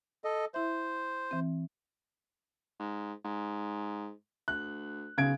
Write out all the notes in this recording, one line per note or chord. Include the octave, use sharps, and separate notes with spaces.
A4 D#5
E4 C5 E5
E3 C4
G#2
G#2
D2 F#6
B1 C#3 G#6 D7